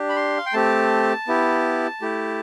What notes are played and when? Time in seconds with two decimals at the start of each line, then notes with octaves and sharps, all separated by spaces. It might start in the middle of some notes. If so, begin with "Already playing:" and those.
Already playing: D4 G4
0.09 B5
0.16 C6
0.37 F5
0.46 G5
0.53 A3 C4 G4 A5
1.28 B3 E4 G4
2.01 A3 E4 G4